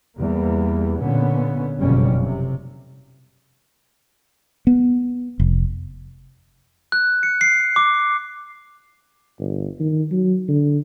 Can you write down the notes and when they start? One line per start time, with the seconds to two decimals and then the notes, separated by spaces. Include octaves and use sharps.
0.17 E2 G3 A#3
0.99 A#2 D3 B3 C#4
1.79 F#1 F2 B2 D3 G3 C#4
2.21 C3
4.67 B3
5.40 F1
6.92 F#6
7.23 C#7
7.41 C7
7.76 D6
9.39 G1
9.80 D#3
10.11 F#3
10.49 D3